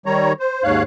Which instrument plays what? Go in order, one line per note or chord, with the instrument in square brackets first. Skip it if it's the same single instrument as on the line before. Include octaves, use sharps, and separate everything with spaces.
[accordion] D#3 G3 C#5 A#5
C5
D#2 G#2 C#5 F5 F#6